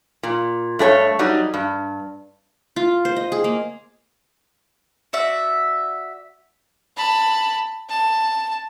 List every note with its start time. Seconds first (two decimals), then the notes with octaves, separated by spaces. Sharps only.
0.23 A#2
0.79 G2 A3 G4 C#5
1.19 F#3 G3 D#4
1.54 G2
2.76 F4
3.05 C5
3.16 D#5
3.32 G#4
3.44 A#3
5.13 F#4 D5 E5
6.97 A5 B5
7.89 A5